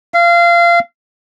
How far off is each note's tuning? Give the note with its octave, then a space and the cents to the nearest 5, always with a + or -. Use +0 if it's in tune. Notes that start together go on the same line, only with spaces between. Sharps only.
F5 -25